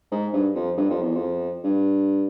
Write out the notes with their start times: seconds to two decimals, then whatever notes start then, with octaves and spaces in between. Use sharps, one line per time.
0.12 G#2
0.33 G2
0.55 F2
0.78 G2
0.90 F2
1.02 E2
1.16 F2
1.64 G2